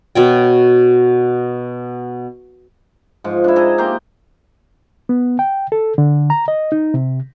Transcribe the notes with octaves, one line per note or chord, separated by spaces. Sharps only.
B2 C#5 G5
G#2 F3
D4 E4
G#4 A4 D#5 A#5
A#3 G4 A#5 C6
B3
G5
A4
D3
A#5
D#5
D#4
C3